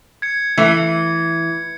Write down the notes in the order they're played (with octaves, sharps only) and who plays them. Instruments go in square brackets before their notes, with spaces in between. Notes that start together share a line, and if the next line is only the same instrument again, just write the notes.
[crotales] G#6 C#7
[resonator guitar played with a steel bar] E3 [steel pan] A3 E5 [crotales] C#7